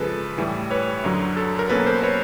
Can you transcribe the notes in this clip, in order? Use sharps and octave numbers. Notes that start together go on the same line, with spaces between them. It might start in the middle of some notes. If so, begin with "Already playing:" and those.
Already playing: C#3 F3 G#3 A4 B4
A2 E3 G3
B4 C#5
F#2 D3 F#3
A4
A#4
B2 F#3 A#3 C#4 A4 B4
A#4 C5
B4 C#5